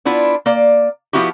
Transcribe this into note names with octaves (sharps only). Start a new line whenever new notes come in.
B3 D4 E4 F4
A#3 D5
F3 B3 C#4 E4 F#4 G4